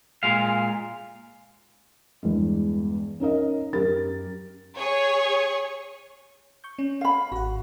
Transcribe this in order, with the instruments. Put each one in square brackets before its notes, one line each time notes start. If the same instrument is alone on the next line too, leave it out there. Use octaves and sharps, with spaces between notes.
[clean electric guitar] A#2 G#3 F5
[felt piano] E2 G2 G#3
C#4 D#4 A#4 D#5
F#2 G4 A#4 A6
[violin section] G#4 C#5 C#6
[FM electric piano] C#6 G6
C#4
[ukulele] F5 B5
[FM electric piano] G#1 F#5 [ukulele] F#4